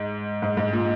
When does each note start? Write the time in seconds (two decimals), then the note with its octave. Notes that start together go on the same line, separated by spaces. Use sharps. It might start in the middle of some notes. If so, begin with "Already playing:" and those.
Already playing: G#2
0.42 G#2
0.57 G#2
0.73 A#2